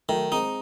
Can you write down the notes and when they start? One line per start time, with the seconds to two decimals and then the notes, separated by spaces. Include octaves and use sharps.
0.09 D#3 F#3 A3
0.32 G#3 C4 D#4